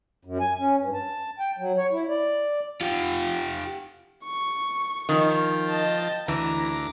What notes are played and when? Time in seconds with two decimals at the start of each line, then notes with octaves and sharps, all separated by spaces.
0.25 F#2
0.41 G#5
0.59 C#4
0.78 G2
0.94 A5
1.39 G5
1.58 F#3
1.77 C#5
1.92 E4
2.09 D5
2.81 F4 G4
4.24 C#6
5.09 D#3 F3 G5
5.68 D#5 A5
6.28 D2 E3 A#5 D6